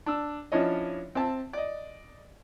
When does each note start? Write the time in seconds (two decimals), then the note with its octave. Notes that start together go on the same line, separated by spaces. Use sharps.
0.06 D4 E6
0.52 F3 C#4 D4 E4 C#5 D#5
1.15 C4 E5 A5
1.53 D5 D#5